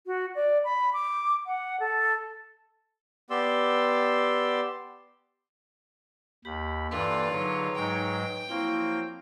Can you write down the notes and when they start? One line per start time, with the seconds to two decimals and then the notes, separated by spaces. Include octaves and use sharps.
0.06 F#4
0.35 D5
0.64 B5
0.93 D6
1.46 F#5
1.80 A4
3.30 B3 G4 D5 C6 E6
6.45 D#2 G4 B5
6.91 G2 E3 A#3 F4 A4 B4 D5
7.31 D3 F#3 D#4 G#4 C#5
7.76 G#2 F#3 G#3 G5
8.49 F3 F#3 A#3 C4 E4 F5 C#6